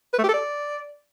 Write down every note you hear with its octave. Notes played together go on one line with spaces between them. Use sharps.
B4
A3
G4
A4
D5